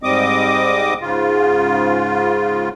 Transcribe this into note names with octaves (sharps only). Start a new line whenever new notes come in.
G#2 G3 C4 D#5 D6 D#6
G#2 C#3 F4